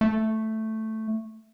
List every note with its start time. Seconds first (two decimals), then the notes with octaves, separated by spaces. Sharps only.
0.01 A3